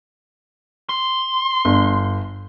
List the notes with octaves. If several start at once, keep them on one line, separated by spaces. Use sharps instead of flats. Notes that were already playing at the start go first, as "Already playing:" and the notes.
C6
G1